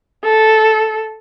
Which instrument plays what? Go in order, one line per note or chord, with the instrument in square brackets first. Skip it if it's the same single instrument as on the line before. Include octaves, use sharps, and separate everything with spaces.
[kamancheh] A4